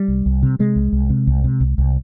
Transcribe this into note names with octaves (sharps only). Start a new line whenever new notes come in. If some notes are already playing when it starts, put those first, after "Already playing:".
Already playing: G3
C2
C2
C3
C3 G#3
C2
C2
C3
C2
C3
C2
C2